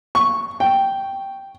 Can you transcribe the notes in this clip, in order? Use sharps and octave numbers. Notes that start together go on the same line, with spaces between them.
C#6
G5